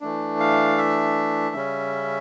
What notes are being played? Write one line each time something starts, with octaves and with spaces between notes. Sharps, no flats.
E3 A3 D4
F5
E5
C#3 G3 C#4